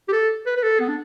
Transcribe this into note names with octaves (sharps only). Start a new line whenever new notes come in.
G4
A4
B4
B4
A4
B3
D4